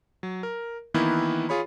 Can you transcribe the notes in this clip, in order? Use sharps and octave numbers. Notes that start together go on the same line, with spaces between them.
F#3
A#4
D#3 E3 A#3 B3 E4 B4
F4 G#4 C#5 B5